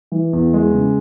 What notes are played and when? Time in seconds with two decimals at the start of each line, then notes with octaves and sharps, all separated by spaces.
0.12 E3
0.33 E2
0.54 G#3
0.73 C#3